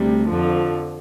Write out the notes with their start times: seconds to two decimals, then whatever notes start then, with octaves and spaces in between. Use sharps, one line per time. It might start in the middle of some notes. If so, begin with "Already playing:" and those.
Already playing: D2 C3 G3
0.29 F2 D3 F3